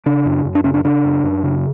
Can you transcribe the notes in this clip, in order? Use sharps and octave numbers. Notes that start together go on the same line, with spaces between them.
C#3 D4
F#2
F#2
D4
C#3 C#4
D4
C#3 D4
F#2
F#2
C#3